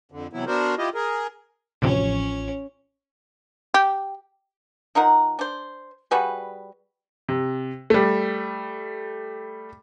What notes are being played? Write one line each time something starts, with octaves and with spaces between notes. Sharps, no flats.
F2 D3
C3 E3 F#3 B3 E4
B3 D4 F#4 A#4 C5
E4 F4 G4 D#5
G#4 A#4
A1 D2 C3 F3 C#4 C#5
G4
F3 D#4 A#4 F#5
D4 C5
G3 F#4 G#4 B4
C3
G3 A3